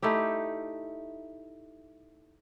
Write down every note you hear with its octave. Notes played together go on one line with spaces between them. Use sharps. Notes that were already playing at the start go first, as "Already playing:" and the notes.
A3 D#4 E4 G4